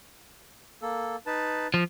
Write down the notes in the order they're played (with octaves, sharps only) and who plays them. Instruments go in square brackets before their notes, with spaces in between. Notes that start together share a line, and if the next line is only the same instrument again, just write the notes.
[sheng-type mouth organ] A#3 A4
D#4 B4 A5
[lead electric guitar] F3